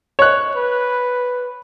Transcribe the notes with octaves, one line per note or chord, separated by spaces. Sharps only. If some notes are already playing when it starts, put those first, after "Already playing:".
C#5 F#6
B4